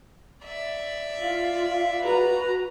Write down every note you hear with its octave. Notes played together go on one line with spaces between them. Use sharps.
D5 E5
F4 F5
F#4 B4 A#5